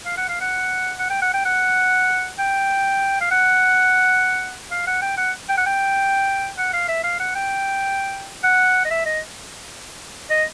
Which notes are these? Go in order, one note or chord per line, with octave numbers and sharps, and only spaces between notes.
F5
F#5
F5
F#5
F#5
G5
F#5
G5
F#5
G5
F5
F#5
F5
F#5
G5
F#5
G5
F#5
G5
F#5
F5
E5
F5
F#5
G5
F#5
D#5
E5
D#5
D#5